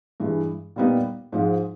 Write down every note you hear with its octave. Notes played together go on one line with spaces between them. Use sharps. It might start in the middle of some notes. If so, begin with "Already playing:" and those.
G2 E3 G#3
A#2 G3 B3 D#4
G#2 F3 G#3